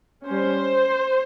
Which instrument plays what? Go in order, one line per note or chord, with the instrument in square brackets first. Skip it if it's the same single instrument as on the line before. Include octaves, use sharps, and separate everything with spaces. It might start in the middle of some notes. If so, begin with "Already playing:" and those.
[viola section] G3 C#4 C5